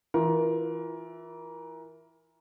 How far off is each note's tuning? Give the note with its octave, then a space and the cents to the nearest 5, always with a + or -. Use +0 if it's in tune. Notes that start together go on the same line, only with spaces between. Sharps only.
E3 +0 F4 +15 A#4 +20